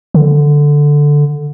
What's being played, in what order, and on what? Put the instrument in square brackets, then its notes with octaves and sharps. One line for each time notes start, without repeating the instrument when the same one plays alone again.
[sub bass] D3